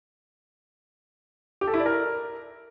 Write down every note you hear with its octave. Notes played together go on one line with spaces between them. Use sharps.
G4
A4
E4
D5
A#4